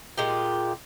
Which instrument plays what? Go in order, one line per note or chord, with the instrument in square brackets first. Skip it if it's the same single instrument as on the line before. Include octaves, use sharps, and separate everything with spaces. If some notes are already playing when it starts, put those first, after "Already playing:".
[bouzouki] A#2 G#3 F4 G4